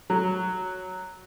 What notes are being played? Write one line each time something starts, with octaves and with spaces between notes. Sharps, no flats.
F#3